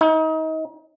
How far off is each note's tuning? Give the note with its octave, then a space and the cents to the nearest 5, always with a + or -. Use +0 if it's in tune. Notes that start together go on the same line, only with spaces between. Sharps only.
D#4 +30